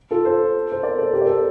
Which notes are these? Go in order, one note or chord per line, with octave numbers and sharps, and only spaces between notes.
F4 A4
A4 C5
C5
A#4 D5
A4 C5
G4 A#4
D5
A4 C5